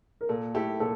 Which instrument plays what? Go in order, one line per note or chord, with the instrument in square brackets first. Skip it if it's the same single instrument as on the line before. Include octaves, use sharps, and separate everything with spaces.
[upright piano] A#4
[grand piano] A#2 [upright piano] A4
[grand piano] A3 E4 G4 [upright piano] A4
[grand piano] A#2 [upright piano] A4